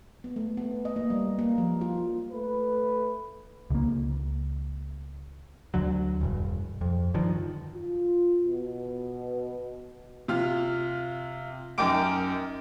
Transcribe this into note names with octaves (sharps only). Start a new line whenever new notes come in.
B3
A3
B3
D#5
A#3
G3
A#3
F3
F4
A3 B4
C#2 A#3
D2 D3 F#3
E1 G2
F2
G2 D3 D#3 F3
F4
B2
C3 F4 F6
F#2 D#4 A#4 G5 D6 D7